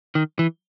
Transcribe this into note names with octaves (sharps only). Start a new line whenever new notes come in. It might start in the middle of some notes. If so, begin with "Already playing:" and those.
D#3
E3